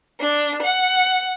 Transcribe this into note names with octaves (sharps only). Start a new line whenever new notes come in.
D4
F#5